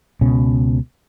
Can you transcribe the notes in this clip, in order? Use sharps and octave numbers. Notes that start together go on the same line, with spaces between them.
C#2 B2 C#4